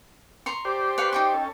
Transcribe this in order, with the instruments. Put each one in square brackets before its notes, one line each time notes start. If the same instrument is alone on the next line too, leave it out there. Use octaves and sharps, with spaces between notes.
[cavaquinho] A#5 C6 C#6
[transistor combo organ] G4 C5 D5
[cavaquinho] B4 F5 C#6
D#4 G5 C#6
[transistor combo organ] C#4 A4